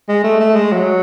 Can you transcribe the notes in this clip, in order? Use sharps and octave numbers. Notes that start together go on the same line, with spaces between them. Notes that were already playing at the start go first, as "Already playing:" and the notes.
G#3
A3
A3
G#3
F#3